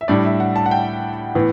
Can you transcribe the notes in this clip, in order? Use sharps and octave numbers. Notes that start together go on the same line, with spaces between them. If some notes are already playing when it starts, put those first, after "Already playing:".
E5
A2 G3 D4 D5
E5
F#5
A5
F#5
G5
A2 E3 B3